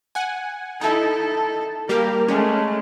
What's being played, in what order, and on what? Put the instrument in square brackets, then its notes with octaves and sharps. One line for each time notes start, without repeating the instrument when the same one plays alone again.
[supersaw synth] F#5 G#5
[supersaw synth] D#4 E4 [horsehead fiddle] A4
[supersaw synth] G3 A#3 G4 [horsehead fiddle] A#4
[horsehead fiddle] G#3 A3 [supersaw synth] C#4